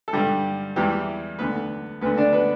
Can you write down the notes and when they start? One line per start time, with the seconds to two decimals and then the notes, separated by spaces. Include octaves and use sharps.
0.08 A4
0.13 G2 D3 G3 G4
0.76 E2 E3 G3 G4
1.39 D2 D3 B3 B4
2.01 D2 D3 B3 B4
2.18 D4 D5
2.33 B3 B4